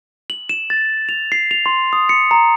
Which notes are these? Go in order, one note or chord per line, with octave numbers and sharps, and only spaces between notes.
F#7
E7
A6
F7
C7
F7
C6
D#6
C#7
A#5